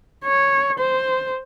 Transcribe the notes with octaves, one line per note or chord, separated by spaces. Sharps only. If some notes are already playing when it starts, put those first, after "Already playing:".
C#5
C5